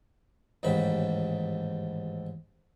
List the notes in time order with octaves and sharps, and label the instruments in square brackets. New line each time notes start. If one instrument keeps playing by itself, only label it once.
[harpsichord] A1 D#2 G#2 D#3 B5